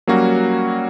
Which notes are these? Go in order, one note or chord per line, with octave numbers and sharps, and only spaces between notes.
F#3 G3 A#3 C#4 F#4